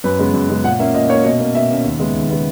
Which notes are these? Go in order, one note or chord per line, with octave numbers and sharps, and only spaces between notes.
F#2 B4
C#3 G#3 B3
F#2
C#3 G#3 B3
A#2 F#5
A#3 C#4 E5
A#2 D#5
A#3 C#4 C#5
B2 D#5
A#3 C#4
B2 E5
A#3 C#4
D#2
C#3 G#3 B3
D#2
C#3 G#3 B3